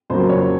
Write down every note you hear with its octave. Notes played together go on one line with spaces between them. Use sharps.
F2 C#3 F#3 A#3 C5
C#5